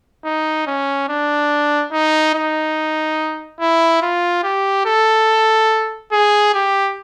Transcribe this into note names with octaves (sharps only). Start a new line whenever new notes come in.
D#4
C#4
D4
D#4
D#4
E4
F4
G4
A4
G#4
G4